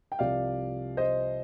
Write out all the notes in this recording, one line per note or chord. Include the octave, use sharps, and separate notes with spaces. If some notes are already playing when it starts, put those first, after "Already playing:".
G5
C2 C3 F3 D5 F5
C5 D#5